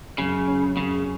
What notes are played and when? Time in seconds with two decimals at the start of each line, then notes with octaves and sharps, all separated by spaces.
0.18 F#2 C#3
0.48 C#4
0.76 F#2 C#3